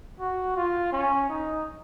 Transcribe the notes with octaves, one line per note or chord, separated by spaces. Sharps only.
F#4
F4
C#4
D#4